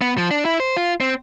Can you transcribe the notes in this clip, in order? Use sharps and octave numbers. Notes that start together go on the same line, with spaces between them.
B3
F3
D4
E4
C5
F4
C4